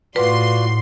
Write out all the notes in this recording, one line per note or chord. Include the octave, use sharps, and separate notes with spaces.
A2 F4 F#4 B4 D5 C6